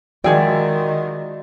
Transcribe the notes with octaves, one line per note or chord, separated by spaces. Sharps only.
D#3 F3 G#3 F#4 G#4 D5 E5 G5